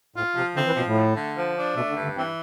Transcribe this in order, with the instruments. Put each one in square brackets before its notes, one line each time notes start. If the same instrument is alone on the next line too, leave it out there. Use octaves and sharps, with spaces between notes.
[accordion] A2 [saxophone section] F4
[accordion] C3 [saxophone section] F3
[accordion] D3 [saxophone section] C4
[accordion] E3
[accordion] B2 [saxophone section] F3
[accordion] A2
[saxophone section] A3
D3
F3
D4
[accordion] B2 [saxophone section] A3
[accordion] D3
[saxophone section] G2
[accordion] D3
[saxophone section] E3 [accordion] C4